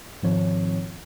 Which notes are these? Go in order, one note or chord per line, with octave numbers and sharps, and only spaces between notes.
G#2 D#3 F3 C4 C#5